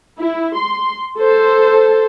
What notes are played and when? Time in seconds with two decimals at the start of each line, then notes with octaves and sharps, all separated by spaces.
0.19 E4
0.56 C6
1.18 A4 C5